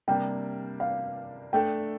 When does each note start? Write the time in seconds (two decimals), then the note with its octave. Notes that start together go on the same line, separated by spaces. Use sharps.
0.08 C3 G3 A#3 D4 G5
0.80 F5
1.53 A3 D4 A4 G5